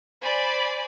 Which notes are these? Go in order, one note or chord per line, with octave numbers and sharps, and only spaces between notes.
C5 D5 G#5 B5